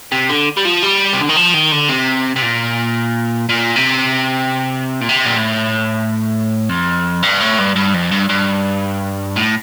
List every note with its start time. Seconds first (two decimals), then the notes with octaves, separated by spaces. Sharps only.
0.12 C3
0.29 D3
0.57 G3
0.65 F3
0.82 G3
1.13 C3
1.21 D3
1.29 D#3
1.36 F3
1.54 D#3
1.72 D3
1.89 C3
2.36 C3
2.42 A#2
3.49 A#2
3.76 C3
5.01 A#2
5.09 C3
5.25 A#2
5.36 A2
6.69 F2
7.23 G2
7.41 A2
7.58 G2
7.76 G2
7.94 F2
8.12 G2
8.29 G2
9.36 A2